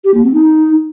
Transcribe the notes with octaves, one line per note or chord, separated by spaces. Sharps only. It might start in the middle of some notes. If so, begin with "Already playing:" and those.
G4
A#3
C4
D#4